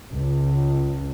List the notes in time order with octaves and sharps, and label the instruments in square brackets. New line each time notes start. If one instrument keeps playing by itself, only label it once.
[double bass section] C#2